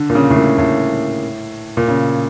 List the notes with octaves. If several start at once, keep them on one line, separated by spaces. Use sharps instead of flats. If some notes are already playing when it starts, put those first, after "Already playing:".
Already playing: D3
A#2
C#3
A2
A#2
A2
A#2
C#3